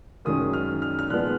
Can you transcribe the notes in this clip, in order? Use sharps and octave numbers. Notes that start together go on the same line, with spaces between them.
F#2 D#3 G#3 C#4 D#6
F6
F6
F6
A#2 F3 G#3 B3 F#6